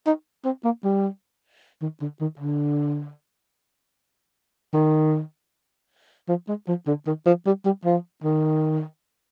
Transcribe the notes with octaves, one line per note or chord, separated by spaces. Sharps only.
D#4
C4
A#3
G3
D#3
D3
D#3
D3
D#3
F3
G#3
F3
D3
D#3
F3
G3
G3
F3
D#3